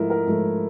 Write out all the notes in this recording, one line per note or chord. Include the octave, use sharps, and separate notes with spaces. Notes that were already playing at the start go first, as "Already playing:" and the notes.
Already playing: G#2 F3 A3 E4 A#4
A#4
G#2 F3 A3